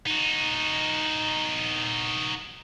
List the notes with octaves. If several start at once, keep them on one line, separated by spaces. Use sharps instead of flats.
D#4 F#4